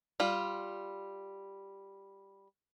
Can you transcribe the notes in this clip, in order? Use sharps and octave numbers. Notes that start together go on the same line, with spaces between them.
G3 F4